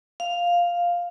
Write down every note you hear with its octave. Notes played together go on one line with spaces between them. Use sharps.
F5